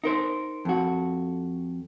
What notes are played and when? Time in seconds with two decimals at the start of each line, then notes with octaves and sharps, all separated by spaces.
0.04 D#4 A#4 C5
0.65 F2 F#4